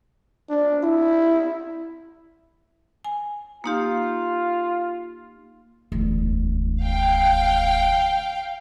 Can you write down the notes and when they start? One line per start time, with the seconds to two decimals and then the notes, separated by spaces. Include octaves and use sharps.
0.50 D4
0.83 E4
3.05 G#5
3.64 A#3 D#4 F4 G4
5.92 E1 D2
6.83 F5 G5